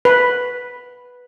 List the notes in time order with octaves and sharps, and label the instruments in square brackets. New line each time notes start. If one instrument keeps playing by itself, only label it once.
[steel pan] B4